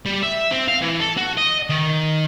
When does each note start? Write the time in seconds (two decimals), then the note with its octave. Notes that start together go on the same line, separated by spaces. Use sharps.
0.05 G3
0.23 E5
0.52 C4
0.68 F5
0.82 E3
1.00 A4
1.17 F#4
1.37 D#5
1.70 D#3